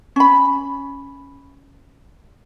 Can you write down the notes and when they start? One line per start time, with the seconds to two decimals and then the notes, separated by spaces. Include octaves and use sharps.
0.16 C#4 B5